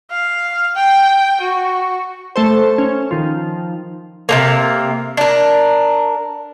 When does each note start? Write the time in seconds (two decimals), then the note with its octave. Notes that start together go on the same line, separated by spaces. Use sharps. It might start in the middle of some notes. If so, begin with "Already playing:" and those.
0.11 F5
0.75 G5
1.41 F#4
2.36 A3 A4 C5
2.78 C#4
3.11 D#3 F3
4.29 C3 G#3 A#3
5.17 D4 A#4